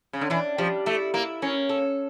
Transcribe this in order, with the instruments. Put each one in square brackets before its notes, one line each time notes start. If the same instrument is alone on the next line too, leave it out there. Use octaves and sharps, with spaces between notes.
[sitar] C#3
D3
[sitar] E3 [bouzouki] D4
[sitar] F3 [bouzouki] G3
[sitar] A3 [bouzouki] E4
[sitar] A#3 [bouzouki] E4
[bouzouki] A#3 [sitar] C#4
[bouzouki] A4